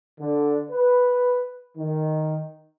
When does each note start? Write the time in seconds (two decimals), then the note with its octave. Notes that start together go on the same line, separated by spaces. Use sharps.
0.20 D3
0.71 B4
1.78 D#3